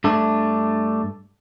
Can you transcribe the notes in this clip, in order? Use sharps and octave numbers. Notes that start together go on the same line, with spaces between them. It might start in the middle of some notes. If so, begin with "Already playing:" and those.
G2 A3 D4